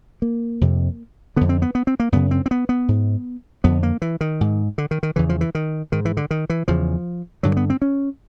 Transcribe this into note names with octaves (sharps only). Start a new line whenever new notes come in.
A#3
F2 C3
F2 D3 B3
C4
B3
B3
C4
A#3
F#2 C#3 B3
C4
C4
B3
B3
G#2
F2 D3 B3
A#3
E3
D#3
G#2
D3
D#3
D#3
E2 C#3 E3
F3
E3
D#3
G#2 D#3
E3
D3
D#3
E3
E2 C#3 F3
G2 D3 F#3
B3
C4
C#4